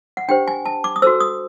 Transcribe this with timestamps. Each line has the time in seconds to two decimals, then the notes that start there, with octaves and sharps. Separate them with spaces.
0.17 F#5
0.28 D4 G4 C5 G5
0.48 G#5
0.66 A5
0.84 D6
0.96 D#6
1.02 F#4 A4 C5 E6
1.20 D#6